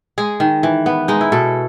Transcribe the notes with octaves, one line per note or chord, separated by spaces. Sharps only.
G#3 G#4
D#3
E3
B3
G#3 D#4
E4
B2 A4